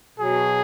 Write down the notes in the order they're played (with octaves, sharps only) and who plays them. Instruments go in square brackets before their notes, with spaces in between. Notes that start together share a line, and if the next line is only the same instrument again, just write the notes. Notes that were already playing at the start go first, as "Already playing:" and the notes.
[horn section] B2 F#3 G#4